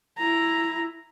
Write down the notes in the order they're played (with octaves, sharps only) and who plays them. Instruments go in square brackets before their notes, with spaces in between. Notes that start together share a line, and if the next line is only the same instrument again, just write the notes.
[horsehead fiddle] E4 A#5